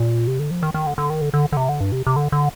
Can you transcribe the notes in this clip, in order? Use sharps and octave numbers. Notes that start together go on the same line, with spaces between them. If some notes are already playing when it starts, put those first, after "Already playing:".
Already playing: A#2
C3
D3
F3
D#3
D#3
D3
D3
D#3
D3
D3
D3
C3
D3
G2
C3
C3
D3
D3